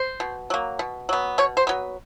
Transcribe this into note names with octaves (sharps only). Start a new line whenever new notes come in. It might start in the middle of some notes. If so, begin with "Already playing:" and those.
Already playing: C5
B2
F#3 A#3
B2
F#3 B3
B2 C#5
C5
F#3 B3